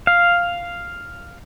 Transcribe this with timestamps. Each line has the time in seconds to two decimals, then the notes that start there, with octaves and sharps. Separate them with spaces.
0.07 F5